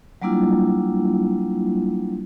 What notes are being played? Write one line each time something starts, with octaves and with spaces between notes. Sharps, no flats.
F#3 G3 A#3 D4 E4 F4